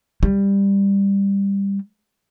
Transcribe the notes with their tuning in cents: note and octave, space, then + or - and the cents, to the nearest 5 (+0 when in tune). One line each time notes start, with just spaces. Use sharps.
G3 +15